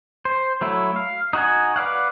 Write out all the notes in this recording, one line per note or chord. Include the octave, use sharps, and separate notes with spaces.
C5
F#3 A3 E4
F5
D#4 F#4 F#5 G#5
B4 D5 F5 F#5